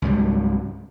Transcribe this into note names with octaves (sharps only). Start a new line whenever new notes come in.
C#2 G#2 F#3 G3